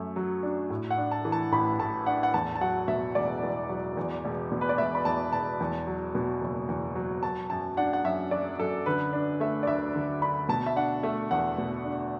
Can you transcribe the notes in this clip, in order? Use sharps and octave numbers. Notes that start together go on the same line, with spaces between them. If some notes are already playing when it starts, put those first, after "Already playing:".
Already playing: F#2 F#3 A3
F#3
D4
A2
F#5
D4
A5
E3
A5
A1 B5
A2 A5
D4 F#5
F#5
E2 A5
A5
F#3 F#5
B2 E5
E1 D5
E2
F#3
E2
E1
B2
B4
D5
E1 E5
B5
E2 A5
E1 A5
E2
F#3
B2
F#1
E2
F#3
F#3 A5
F#2 A5
D4 F#5
F#5
F#2 E5
F#3 D5
F#2 A4
D3 B4
D4
A3 E5
D5
D2 E5
D3
D4 B5
B2 A5
E5
D4 F#5
A3 E5
E2 F#5
B2
D4